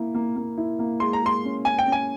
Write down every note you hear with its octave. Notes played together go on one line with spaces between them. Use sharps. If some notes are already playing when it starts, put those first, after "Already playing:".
Already playing: A#3 E4
A#3
A#3
E4
A#3
G#3 C6
A#5
G#3 C6
C#4
C#4 G#5
G5
C#4
G#5